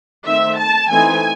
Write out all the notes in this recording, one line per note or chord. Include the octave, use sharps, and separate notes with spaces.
D#3 A3 C4 D#4 E5
A5
E3 A3 C4 D#4 G#5